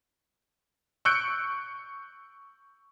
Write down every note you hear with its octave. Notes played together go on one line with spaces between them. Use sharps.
C#6 E6 F#6 G6 C#7 D7